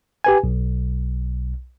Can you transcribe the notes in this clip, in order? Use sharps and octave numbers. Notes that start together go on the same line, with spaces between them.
G4 B4 G#5
B1